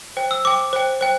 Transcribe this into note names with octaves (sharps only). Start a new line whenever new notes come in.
C5 G5
E6
C5 G5 D6
C5 G5
C5 G5